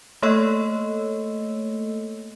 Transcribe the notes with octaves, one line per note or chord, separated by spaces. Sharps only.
A3 A#3 A4 C#5 D#5 E6